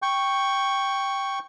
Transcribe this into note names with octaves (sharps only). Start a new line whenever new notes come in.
G5 C#6